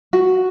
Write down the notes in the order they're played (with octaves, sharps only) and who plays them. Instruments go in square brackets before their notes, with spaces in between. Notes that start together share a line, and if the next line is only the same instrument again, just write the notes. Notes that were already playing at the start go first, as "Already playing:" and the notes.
[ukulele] F#4